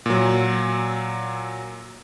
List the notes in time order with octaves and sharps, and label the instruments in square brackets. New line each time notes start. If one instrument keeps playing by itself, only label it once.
[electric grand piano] A#2 F#3